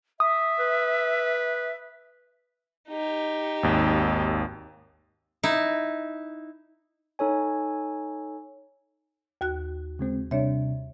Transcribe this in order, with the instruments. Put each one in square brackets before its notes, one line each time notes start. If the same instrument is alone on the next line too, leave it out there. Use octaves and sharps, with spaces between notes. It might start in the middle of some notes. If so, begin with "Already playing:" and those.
[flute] E5 [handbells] D#6
[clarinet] B4
[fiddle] D#4 G4
[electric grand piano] G#1 D#2
[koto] D#4 E4
[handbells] D#4 A4 C#5 G#5
[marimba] D#2 F#4 F#6
[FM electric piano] C#3 G#3 C4
[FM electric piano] C3 G3 D4 [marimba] C#5 E5